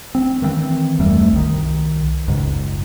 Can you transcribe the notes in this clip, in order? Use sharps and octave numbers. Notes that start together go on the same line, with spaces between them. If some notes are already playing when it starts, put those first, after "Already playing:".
C4
D#3 E3 A3 C4
D#1 F#2 G3 A3
C2 D#3
F#1 C#2 G#2